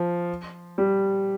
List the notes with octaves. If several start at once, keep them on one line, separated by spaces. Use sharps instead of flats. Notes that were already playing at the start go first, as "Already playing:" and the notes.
Already playing: F3
G3